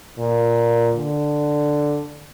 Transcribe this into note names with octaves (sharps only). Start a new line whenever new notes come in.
A#2
D3